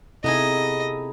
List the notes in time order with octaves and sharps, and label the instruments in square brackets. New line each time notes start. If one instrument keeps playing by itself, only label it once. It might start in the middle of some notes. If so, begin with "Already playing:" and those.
[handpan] C3 E4 A4 [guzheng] B3 D#4 G#4 [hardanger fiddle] D#5